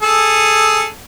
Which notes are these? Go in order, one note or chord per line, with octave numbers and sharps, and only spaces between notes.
G#4 A4